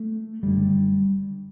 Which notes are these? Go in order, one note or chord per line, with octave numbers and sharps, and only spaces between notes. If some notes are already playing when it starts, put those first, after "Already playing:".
Already playing: A3
F#1 F#2 D3 G3